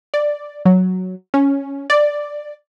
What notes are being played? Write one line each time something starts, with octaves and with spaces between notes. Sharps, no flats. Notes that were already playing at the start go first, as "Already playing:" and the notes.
D5
F#3
C#4
D5